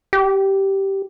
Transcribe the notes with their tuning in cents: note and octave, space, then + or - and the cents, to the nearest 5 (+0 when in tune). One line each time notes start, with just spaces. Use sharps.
G4 -10